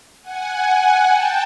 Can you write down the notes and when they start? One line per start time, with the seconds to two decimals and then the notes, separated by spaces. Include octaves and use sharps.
0.22 F#5 G#5
0.51 F#5 G#5
1.07 G5 A5